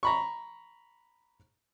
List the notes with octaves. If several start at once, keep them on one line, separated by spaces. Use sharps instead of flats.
A#5 B5 C#6